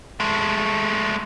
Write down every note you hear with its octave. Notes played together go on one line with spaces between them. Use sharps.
G#3 A3